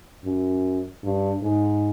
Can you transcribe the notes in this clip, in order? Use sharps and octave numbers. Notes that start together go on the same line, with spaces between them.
F#2
G2
G#2